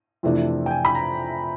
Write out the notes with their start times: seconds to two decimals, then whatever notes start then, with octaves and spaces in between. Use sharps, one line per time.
0.23 F2 C3 E3 A3 D4
0.66 G5
0.71 G#5
0.85 B5
0.95 A#5